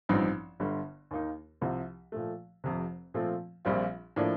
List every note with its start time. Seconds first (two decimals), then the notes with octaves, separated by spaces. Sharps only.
0.09 A1 G2 F3 C4 D#4
0.60 G1 G2 D3
1.11 D#2 D#3 A#3 D#4
1.61 C2 C3 F3 C4
2.12 A#2 F3 A3
2.64 F1 F2 C3
3.14 A#2 F3 A3 C4 F4
3.65 A#1 A#2 G3 C4 F4
4.16 A2 F3 A#3 D4